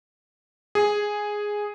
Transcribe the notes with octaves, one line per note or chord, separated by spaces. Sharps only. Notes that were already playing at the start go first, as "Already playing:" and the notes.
G#4